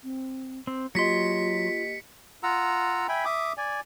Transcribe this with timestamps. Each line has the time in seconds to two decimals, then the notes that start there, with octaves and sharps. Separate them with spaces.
0.04 C4
0.67 C4
0.95 F#3 A#3 F4 G4 D#5 C6 B6 C#7
2.43 F4 F#5 A#5 E6
3.09 E5 G5 G#5 B5
3.25 E5 D6 D#6
3.57 D5 G#5